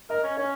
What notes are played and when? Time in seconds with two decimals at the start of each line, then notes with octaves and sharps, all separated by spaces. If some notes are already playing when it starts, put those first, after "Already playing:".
0.10 A#4 D#5
0.24 C#4
0.37 C#4 C#5